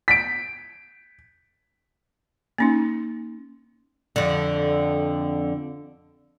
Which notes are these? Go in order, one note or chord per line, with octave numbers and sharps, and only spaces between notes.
B6 D7
A#3 C#4 D#4
F2 D3